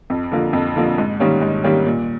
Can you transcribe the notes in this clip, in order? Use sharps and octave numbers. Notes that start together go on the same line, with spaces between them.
F2
D3 F3 A#3
F2
D3 F3 A#3
G#2
D#3 G3 A#3 C#4
G#2
D#3 G3 A#3 C#4
A#2